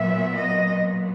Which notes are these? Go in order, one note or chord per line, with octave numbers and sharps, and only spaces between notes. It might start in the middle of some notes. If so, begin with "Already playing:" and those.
Already playing: A#2 F#3 B3 E5
D#5